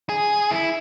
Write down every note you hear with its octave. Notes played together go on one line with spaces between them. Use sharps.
G#4
E4